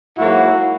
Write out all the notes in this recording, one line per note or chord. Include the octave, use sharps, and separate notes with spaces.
G#2 F#3 A#3 E4 F#4